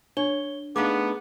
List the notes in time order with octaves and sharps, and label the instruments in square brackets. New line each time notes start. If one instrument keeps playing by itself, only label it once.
[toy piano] D4 [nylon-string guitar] C#5 [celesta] G7
[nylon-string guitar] A3 D4 D#4 [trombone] B3 [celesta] G#4 [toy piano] F5 D6